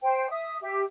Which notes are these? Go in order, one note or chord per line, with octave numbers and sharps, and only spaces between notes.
C5 G5
E5 D#6
G4 E5